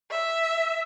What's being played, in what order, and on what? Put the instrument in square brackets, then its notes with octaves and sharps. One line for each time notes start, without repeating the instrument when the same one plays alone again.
[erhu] E5